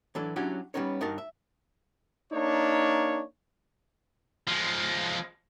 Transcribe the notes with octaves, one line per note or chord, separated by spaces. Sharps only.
E3 F#3 D4 A4
F#3 C#4 D4 E4 F#4 G4
G3 G#3 B3 C#4 D#4 C#5
G2 D#4 F#4 A#4 A5
E5
A#3 D4 D#4 C#5
F3 G#3